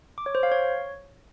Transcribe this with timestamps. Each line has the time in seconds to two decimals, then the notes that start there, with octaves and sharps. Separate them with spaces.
0.18 D6
0.26 C#5
0.35 C5
0.43 F5
0.52 C#5